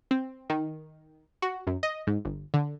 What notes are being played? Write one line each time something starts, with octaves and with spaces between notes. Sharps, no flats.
C4
D#3
F#4
F#2
D#5
G#2
G1
D3